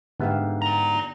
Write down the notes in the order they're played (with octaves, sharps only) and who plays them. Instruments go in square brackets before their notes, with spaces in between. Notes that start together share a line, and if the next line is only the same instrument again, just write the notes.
[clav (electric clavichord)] G#2 B3 E5 [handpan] D3 G4 F5
[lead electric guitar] D5 A#5